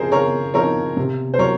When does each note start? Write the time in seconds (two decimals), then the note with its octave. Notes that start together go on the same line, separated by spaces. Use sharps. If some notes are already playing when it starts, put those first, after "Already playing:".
Already playing: C#3 F3 C4 D#4 G#4 A#4 C5
0.12 C#3 A#4 C#5
0.54 F3 C4 D#4 A#4 C#5
0.97 C3
1.34 C5
1.39 F#3 A#4 C#5